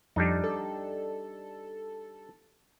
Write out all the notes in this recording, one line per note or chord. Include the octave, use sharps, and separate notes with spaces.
F2 G3 D4 D#4
A4